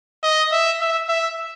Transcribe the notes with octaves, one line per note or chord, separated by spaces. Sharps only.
D#5
E5
E5
E5